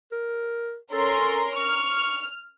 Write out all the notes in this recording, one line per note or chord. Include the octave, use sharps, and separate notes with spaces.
A#4
C#4 A4 A#4 C6
C#6 F6